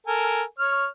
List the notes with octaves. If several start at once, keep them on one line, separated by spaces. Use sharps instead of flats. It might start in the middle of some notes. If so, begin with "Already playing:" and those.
A4 A#4 G#5
C#5 F6